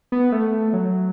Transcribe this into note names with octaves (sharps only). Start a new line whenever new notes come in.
B3
A3
F#3